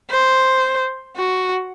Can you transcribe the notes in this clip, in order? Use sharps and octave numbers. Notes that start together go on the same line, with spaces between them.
C5
F#4